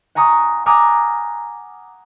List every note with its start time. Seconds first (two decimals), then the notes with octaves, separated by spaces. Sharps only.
0.15 F#5 G#5 A#5 C#6 D#6
0.66 F#5 G#5 A#5 D6 D#6 F6